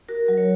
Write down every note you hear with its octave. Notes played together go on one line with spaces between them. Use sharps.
F#4 A#4
F#3 A#4
C#5